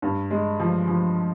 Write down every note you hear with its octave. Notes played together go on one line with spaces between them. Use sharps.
G2
G#3
F3
F3